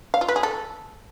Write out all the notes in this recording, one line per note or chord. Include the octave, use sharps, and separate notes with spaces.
F5
F4
B4
G#4
A4